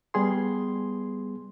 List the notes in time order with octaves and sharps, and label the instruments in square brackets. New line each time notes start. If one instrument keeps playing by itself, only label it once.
[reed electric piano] G3 B3 G#4 C6